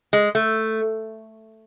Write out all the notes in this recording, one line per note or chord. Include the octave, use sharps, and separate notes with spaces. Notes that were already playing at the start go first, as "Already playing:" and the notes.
G#3
A3